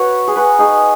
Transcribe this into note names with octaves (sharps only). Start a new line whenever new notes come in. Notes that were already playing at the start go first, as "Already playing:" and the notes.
Already playing: F#4 B4 C#5
G#4
F#4 B4
D#4 G#4